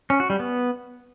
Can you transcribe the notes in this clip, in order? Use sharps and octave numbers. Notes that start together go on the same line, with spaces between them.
C#4
F#4
G3
B3